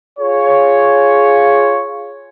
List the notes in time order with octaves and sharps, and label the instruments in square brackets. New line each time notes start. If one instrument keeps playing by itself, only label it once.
[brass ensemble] F4 G#4 C#5